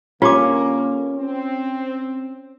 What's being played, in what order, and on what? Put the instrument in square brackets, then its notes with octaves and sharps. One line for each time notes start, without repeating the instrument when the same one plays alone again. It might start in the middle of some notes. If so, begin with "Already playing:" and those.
[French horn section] D3 A#3 [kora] C#4 [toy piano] F4 G4 D6
[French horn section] C4